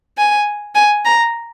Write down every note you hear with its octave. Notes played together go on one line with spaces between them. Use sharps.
G#5
G#5
A#5